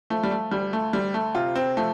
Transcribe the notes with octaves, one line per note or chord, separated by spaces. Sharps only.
F3 A3
G3
A3
D2 G3
A3
D2 G3
A3
C3 F4
C4
F3 A3